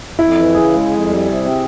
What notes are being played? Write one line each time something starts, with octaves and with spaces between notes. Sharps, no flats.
F2 E4
E3
C#3 G#4
G#3
F2
G3
C3
C4